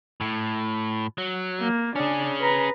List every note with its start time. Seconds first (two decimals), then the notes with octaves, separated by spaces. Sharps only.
0.21 A2
1.18 F#3
1.60 A#3
1.96 C#4 D4 G#4
2.40 B4 A#5